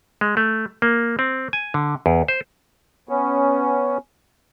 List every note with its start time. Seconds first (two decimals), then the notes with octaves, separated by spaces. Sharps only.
0.21 G#3
0.37 A3
0.82 A#3
1.19 C4
1.53 G#5
1.74 D3
2.06 E2
2.28 C5
3.09 B3 C#4